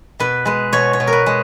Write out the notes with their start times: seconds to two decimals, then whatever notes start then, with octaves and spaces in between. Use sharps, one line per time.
0.20 B2 B4
0.46 G#3 B4
0.73 B2 C#5
0.93 C#5
1.00 B2
1.07 A#4
1.13 B4
1.26 G#3